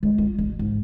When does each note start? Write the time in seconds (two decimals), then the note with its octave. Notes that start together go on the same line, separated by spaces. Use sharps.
0.03 G#3
0.18 F4
0.38 A1
0.59 G#2